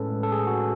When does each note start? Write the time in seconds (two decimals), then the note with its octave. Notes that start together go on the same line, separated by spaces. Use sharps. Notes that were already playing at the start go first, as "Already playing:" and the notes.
Already playing: A2 G#3 C#4 A4 B4
0.23 A4
0.32 G#4
0.47 F#4